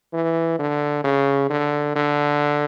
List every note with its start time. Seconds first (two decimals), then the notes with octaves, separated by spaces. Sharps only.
0.13 E3
0.59 D3
1.04 C#3
1.50 D3
1.96 D3